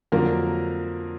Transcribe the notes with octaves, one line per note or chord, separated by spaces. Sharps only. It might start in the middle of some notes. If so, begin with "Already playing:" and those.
F2 D3 F#3 A#3 A#4